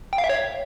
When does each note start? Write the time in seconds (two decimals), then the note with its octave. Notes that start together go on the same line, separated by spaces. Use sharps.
0.13 G5
0.18 F5
0.24 E5
0.29 C#5